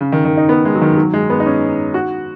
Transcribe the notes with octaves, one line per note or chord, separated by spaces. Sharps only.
C#3
D#3
D#3
D#4
B3
G#3
F#3
D#3
F#3
G#3
B3
D#4
C#4
F#4